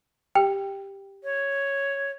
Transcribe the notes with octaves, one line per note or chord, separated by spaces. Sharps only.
G4 G5
C#5